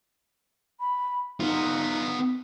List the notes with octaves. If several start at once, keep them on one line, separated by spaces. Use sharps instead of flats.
B5
B3 D#4 F4